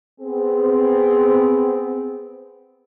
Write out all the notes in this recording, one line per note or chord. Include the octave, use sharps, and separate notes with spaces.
B3 C4 G#4